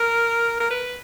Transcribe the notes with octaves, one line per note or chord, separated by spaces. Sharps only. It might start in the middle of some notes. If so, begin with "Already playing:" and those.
Already playing: A#4
A#4
B4